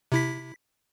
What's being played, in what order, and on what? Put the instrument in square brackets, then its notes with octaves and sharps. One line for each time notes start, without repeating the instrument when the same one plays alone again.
[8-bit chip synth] C3 E4 B6